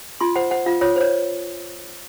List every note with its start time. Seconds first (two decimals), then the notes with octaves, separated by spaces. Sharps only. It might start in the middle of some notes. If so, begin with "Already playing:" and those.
0.21 F4 C6
0.36 C5 F#5
0.51 C5 F#5
0.66 F4 F5
0.81 F4 C#5
0.96 C5 C#5